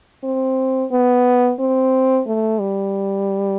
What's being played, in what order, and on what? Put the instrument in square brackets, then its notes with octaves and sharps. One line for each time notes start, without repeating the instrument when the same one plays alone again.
[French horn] C4
B3
C4
A3
G3